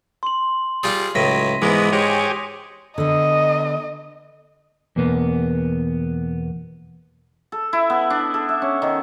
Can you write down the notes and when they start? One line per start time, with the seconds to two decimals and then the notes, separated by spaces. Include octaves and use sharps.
0.23 C6 F#7
0.83 G3 F4 G#4
1.15 C#2 A2 F#3 A#6 B6 D#7
1.62 G#2 E3 G#3 B3 D6 D#6 B6
1.93 G#3 G4 C#5 G#5 F7
2.98 D3 B3 D#5
4.96 E2 B2 A#3 B3
7.52 A4
7.73 E4
7.90 B3
8.10 D4
8.34 A4
8.49 E5
8.62 C#4
8.82 D#3